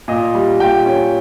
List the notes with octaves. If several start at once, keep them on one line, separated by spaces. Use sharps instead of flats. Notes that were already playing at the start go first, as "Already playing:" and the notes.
A#2 D#5
G3
A#2 G5
C#4